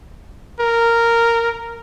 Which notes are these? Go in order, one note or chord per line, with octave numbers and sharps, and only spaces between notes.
A#4